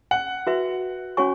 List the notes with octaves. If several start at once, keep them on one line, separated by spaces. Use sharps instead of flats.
F#5
F#4 B4 E5
C#4 F#4 C#5 G#5 C#6